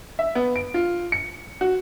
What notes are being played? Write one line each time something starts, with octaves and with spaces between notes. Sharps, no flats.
E5
B3
D7
F4
C#7
F#4